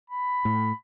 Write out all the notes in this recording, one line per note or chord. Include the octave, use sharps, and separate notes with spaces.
B5
A2